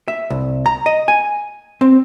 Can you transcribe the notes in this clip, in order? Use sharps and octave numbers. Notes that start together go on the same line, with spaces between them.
E5
C2
A#5
D#5
G#5
C4